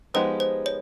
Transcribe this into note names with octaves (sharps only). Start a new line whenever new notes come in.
F3 G#3 B3 D#4 G4 C5
C5
C#5